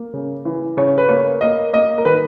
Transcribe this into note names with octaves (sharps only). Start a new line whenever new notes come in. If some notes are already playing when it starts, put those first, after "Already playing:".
Already playing: A#3
C#3
E3
C#3 C#5
B4
A#3 C#5
A#3 D#5
A#3 D#5
A#4
D#3 B4